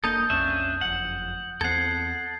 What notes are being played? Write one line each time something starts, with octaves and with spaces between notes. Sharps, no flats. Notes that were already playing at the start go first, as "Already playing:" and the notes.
F1 A#3 D4 D#4 A4 D#6 G6
B1 F2 C#4 D4 E5
F#1 F2 F#5
E2 A3 C4 A4 F#5 G#6 C7